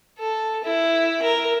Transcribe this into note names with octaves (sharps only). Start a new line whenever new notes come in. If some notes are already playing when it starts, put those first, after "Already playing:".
A4
E4
A#4